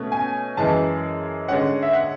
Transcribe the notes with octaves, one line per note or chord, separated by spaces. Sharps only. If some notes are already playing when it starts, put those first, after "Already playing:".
Already playing: B2 A3 C#4
G#5
F#2 E3 G#3 A5
D3 G#3 C#4 F#5
E5
F#5